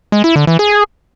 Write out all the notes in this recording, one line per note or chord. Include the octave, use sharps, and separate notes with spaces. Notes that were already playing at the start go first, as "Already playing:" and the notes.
G#3
E4
D3
E3
G#4